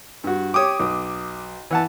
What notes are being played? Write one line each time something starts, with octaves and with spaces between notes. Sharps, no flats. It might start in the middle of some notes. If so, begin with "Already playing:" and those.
G2 F#4
G4 C#5 D6 D#6
B1
E3 F#5 A5